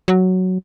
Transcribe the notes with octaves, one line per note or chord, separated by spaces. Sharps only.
F#3